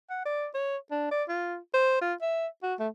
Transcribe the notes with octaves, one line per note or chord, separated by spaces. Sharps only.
F#5
D5
C#5
D4
D5
F4
C5
F4
E5
F#4
A3